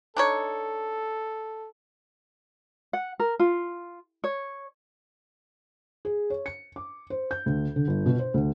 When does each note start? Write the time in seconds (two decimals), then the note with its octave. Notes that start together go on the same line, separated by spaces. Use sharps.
0.17 D4 D#4 A4 C#5
2.93 F#5
3.20 A#4
3.39 F4
4.24 C#5
6.05 G#4
6.30 C#5
6.46 C#7
6.76 D6
7.10 C5
7.31 G6
7.46 D2
7.76 D3
7.88 G1
8.06 B2
8.19 C5
8.34 D2